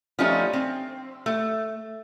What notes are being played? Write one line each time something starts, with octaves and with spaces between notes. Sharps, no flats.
F3 G3 A3 C#4 D#4 F4
C4
A3